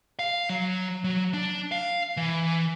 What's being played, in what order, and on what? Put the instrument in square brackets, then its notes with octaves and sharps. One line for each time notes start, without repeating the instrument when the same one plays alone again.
[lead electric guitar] F5
F#3
F#3
D4
F5
E3